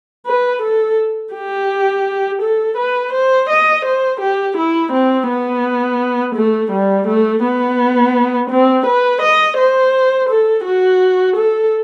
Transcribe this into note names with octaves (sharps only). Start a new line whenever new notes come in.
B4
A4
G4
A4
B4
C5
D#5
C5
G4
E4
C4
B3
A3
G3
A3
B3
C4
B4
D#5
C5
A4
F#4
A4